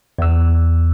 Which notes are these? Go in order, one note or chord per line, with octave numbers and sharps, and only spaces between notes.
E2 E6